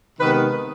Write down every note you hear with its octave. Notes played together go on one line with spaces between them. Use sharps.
C3 D#3 G#3 B3 B4